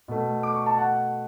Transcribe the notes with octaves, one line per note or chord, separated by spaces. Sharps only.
B2 A3
D6
C#6
A5
F#5